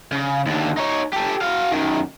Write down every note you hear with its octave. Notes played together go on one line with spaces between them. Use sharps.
C#3
D#2 D3
D#4 C#5
G4 A4
F#4 F5
F#2 D#3